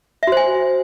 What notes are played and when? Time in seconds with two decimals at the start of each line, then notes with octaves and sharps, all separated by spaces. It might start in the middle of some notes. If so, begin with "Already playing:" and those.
0.23 E5
0.27 F#4
0.32 C5
0.37 G#5